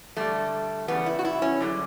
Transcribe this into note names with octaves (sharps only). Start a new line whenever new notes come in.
G2 D3 G3 A3
E2 C#3 G3 B3
E4
F#4
E4
C#4
F#2 D3 G3